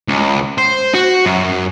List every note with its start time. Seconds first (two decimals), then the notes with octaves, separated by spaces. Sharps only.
0.09 C#2
0.58 C5
0.94 F#4
1.26 F#2